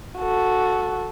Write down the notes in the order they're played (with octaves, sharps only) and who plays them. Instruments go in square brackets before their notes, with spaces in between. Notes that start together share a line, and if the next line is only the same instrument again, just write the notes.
[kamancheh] F#4 A4